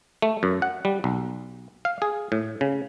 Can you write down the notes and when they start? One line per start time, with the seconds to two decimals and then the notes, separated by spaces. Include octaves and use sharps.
0.22 A3
0.43 F#2
0.62 F#5
0.85 G3
1.04 B1
1.85 F5
2.02 G#4
2.32 A2
2.61 C#3